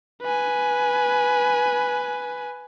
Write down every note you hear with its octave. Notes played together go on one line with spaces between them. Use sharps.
B4 G#5